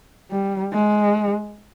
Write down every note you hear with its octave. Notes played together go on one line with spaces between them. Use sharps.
G3
G#3